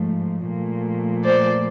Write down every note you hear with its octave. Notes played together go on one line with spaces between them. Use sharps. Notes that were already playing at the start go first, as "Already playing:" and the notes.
Already playing: G#2 F3 A3
A#2 F3 A3
C5 D5